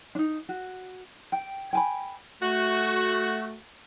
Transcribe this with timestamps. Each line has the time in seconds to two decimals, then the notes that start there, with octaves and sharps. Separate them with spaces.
0.15 D4 D#4
0.49 F#4
1.32 G5
1.73 G5 G#5 B5
2.42 A3 F#4